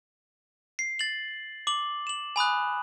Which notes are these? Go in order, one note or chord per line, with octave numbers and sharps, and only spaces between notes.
C7
A6 F#7
D6 F#7
E7 F#7
G#5 B5 D#6 F#6